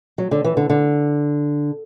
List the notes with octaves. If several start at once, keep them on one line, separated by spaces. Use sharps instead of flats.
F#3
D3
E3
D3
D3